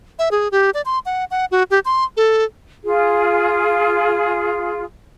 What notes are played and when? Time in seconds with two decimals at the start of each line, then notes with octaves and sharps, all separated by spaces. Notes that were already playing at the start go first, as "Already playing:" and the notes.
0.19 E5
0.31 G#4
0.52 G4
0.74 D5
0.86 C6
1.06 F#5
1.31 F#5
1.51 F#4
1.71 G4
1.85 C6
2.17 A4
2.84 F4 G#4